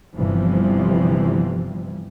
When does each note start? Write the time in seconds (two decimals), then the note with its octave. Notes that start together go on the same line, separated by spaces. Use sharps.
0.17 G1 C3 E3 F3 G3